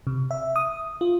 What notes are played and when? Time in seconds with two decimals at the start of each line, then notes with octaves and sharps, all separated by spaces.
0.07 C3
0.31 E5
0.56 D#6
1.01 F4